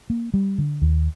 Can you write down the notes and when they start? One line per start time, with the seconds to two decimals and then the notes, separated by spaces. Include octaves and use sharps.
0.10 A#3
0.34 G3
0.58 D3
0.82 D#2